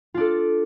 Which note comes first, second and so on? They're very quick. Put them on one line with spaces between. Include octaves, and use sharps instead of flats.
F4 D4 A4